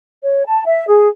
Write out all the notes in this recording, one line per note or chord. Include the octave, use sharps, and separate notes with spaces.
C#5
A5
E5
G#4